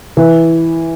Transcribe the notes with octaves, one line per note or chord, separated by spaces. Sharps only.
E3